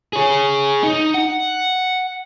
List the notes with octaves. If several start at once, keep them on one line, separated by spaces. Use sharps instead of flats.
G#4 C#5
D#4
F#5